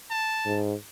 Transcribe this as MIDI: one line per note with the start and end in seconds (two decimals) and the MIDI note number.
0.11 0.60 81
0.46 0.74 44